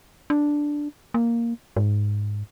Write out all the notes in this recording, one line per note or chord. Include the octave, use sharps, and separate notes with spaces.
D4
A#3
G#2